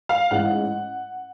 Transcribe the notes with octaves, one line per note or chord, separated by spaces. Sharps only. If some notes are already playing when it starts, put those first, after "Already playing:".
F5
A1 G#2 E3 G#3 F#5